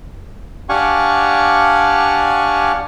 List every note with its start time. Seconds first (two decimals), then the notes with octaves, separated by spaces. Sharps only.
0.69 D4 G4 F5 F#5 G#5 C#6